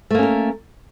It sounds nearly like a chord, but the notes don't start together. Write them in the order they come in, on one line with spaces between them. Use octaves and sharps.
A3 A#3 C#4 A#4